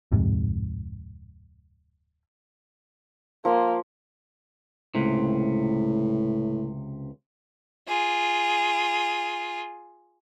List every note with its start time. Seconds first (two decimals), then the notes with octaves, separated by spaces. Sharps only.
0.12 D1 F2 G#2 C3
3.45 F3 A#3 F5 C6
4.95 C#2 A2 C3
7.87 F4 G#4